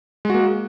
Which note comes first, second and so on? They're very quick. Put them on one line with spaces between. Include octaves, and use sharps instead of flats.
G#3 F#4 A#3